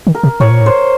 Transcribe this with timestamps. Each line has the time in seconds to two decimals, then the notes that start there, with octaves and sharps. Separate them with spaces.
0.07 D#3
0.15 A#4
0.23 C3
0.40 A2 C#5
0.50 A#2
0.61 A2
0.66 C5